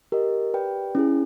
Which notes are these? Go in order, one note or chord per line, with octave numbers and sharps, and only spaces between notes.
G4 A#4 D#5
G4 B4 D5 G5
C#4 E4 G#4